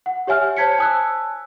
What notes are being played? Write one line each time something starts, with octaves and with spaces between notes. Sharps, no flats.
F#5
G4 C#5 E5 G#5 F6
C5 C#5 A5 G#6 B6 C#7
G#5 A5 D#6 E6 F#6